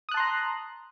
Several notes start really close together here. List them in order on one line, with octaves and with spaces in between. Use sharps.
D#6 F#6 A5 C6 A#5